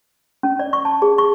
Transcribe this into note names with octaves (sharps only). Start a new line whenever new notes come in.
C#4
D5
C#6
A5
G#4
C#6